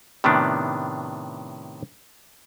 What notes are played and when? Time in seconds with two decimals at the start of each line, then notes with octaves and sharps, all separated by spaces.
0.24 A2 C3 D#3 B3 D4